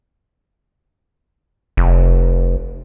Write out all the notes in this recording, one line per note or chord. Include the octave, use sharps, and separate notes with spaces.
F1